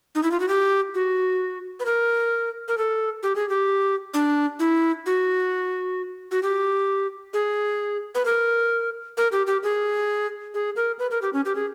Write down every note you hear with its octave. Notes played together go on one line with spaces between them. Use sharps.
D#4
E4
F4
F#4
G4
F#4
B4
A#4
A#4
A4
G4
G#4
G4
D4
E4
F#4
F#4
G4
G#4
B4
A#4
A#4
G4
G4
G#4
G#4
A#4
B4
A#4
G4
C#4
G4
G#4